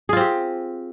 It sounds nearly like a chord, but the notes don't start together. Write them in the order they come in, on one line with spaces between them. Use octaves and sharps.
G#4 F4 C4 G4